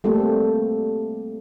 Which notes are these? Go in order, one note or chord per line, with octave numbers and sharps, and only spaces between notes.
G3 A3 A#3 C4 G4 A4